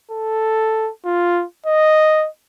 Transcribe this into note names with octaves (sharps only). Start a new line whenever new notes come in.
A4
F4
D#5